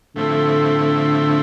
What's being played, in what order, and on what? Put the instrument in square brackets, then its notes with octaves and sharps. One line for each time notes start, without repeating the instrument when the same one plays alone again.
[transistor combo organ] A2 F3 A3 C4 E4 [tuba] D3